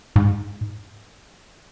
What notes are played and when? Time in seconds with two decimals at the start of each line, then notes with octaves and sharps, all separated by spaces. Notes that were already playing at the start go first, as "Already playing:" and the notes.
0.16 G#2